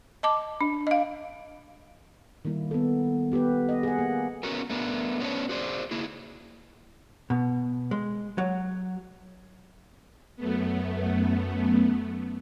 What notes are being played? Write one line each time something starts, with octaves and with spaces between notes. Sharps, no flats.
D#5 A5 D6
D4
D#5 F5
D#3 G3 A#3 E4
B3 A4
B3 G4 A4 B4
D#5
G#4 F#5
A#3
B3 C#4 F#4 A#4
A3 B3 D4 A#4
B3 C#4 D4 G#4 B4 C#5
F#4 G#4 C5 D5
A#3 E4 G#4
B2
G#3
F#3
F#2 A3 B3